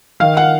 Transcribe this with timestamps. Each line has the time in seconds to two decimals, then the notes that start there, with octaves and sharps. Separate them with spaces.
0.20 D#3 F5
0.37 F#5